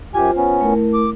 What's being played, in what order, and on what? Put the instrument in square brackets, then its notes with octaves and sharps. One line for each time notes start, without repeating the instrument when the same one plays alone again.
[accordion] F#2 G4 G#5 [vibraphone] F4 C5
[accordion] B3 C#4
[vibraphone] A3 E4 A#4
[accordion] D6